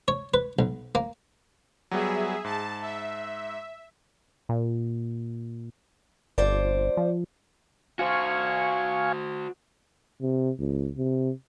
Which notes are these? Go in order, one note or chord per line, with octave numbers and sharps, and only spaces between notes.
C#5
B4
B1
A#3
F#3 G3 B3 G#4 E5
G#2 A5
E5
A#2
G1 F2 C5 D5
F3
F#4 C5 F5 G#5 C#6
C3
C#2
C3